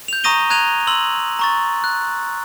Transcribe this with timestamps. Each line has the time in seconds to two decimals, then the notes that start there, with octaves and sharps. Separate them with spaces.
0.08 G6 F7
0.24 A#5 C#6 D#6 A#6 D#7 G7
0.50 A#5 F#6 G#6 D#7 F7
0.87 C6 E6 F#7
1.39 A#5 C#6 A6
1.84 F#6